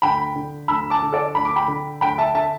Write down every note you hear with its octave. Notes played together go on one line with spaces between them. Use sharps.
D2 G5 B5
D3
D2 B5 E6
A5 D6
D3
A4 D5
D2 B5
D6
G5 B5
D3
D2 G5 B5
E5 A5
D3 E5 A5